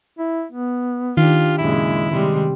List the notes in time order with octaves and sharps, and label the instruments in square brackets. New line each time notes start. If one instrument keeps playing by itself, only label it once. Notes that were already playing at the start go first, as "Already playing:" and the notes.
[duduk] E4
B3
[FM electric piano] D#3 [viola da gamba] D4 G4 [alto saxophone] F4
[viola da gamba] F#2 A#2 C#3 [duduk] G#3 [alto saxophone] E4
[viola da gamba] C3 G3 [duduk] G#3